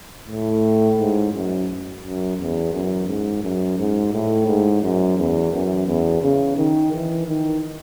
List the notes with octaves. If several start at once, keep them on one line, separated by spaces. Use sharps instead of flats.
A2
G#2
F#2
F#2
E2
F#2
G#2
F#2
G#2
A2
G#2
F#2
E2
F#2
E2
C#3
D#3
E3
D#3